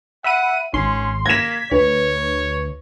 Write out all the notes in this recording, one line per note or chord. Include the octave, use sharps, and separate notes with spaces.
E5 F#5 B5 D#7
G#1 G#2 C#4 C6
A#3 G#6 A#6 B6 E7
D2 B4 C#5